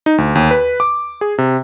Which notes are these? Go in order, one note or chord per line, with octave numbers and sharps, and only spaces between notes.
D#4
D2
D#2
B4
D6
G#4
C3